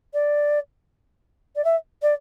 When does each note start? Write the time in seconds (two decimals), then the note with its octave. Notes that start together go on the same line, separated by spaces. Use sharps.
0.14 D5
1.56 D5
1.65 E5
2.02 D5